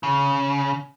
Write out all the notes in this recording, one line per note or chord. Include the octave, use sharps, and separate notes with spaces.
C#3